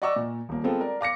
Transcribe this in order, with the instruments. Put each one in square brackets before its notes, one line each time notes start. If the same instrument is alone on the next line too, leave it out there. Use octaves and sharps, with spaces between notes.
[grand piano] D5 D#5 F#5 C#6 D6 E6
A#2
D#1 A#3
G#3 B3 C4 F4 A4
A#4 D5
F5 D6 A#6 C#7